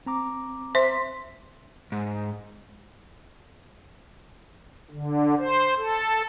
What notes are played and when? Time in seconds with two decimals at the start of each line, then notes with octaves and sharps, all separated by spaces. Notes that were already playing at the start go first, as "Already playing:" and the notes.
0.06 C4 A#5 D6
0.75 C5 E5 C6 B6
1.92 G#2
4.91 D3
5.38 C5
5.78 A4